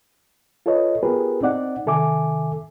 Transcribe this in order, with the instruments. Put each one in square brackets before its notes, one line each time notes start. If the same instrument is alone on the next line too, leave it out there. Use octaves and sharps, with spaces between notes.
[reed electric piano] F4 A4 B4 C#5 D#5
B3 F4 G4 G#4 A#4 B4
C4 D#4 D5 F#5
C3 D#3 A4 E5 G#5 D6